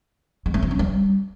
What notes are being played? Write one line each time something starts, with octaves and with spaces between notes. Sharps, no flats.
G#3
A3
F3
C#4
G3